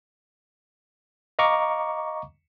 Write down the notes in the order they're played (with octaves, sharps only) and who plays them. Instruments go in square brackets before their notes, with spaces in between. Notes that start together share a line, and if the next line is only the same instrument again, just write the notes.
[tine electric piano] D#5 F5 A#5 C#6 D6